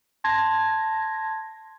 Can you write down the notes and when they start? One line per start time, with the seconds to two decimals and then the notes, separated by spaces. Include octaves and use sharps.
0.24 A5 C6 G#6 A#6